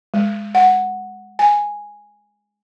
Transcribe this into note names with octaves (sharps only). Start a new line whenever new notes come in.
G#3
F#5
G#5